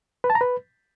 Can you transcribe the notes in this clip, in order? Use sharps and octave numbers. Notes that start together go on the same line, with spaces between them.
B4
A5
A#5
B4